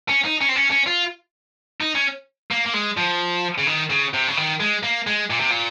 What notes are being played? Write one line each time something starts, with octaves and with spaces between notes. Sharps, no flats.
C#4
D#4
C#4
C4
C#4
C#4
F4
D#4
C#4
A#3
A#3
G#3
F3
C#3
D#3
C#3
C3
C#3
D#3
G#3
A#3
G#3
A#2
C3
A#2